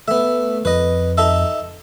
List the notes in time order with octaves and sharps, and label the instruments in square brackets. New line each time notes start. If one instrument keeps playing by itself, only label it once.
[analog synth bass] A3 [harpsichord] B3 E5
[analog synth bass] F2 [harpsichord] B4 D#5
[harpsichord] D#4 A4 E5